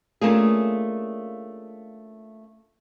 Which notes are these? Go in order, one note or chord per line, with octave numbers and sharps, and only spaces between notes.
A3 A#3 C#4 D4 F4 G#4